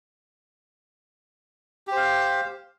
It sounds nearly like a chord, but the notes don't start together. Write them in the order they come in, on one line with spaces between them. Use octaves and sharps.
G4 C5 F5